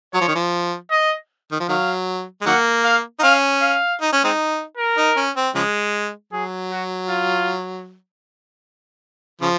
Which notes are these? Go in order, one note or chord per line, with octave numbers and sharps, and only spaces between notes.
F#3 C#5
F3
D#3
F3
D#5
D#3
F3
D#3 F#3 F5
G#3
D#3 F#3 A#3 F#5
F5
D#4
C#4 F5
F5
D#4
C#4
G#3 C4 D#4
A#4
D#4
C#4
C4
C#3 F3 G#3
F#3 G#4
F#4
F4
C#3 F3